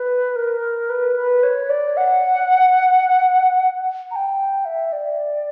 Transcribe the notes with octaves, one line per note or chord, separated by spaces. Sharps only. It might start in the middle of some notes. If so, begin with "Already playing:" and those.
Already playing: B4
A#4
B4
B4
C#5
D5
F#5
A#5
G5
E5
D5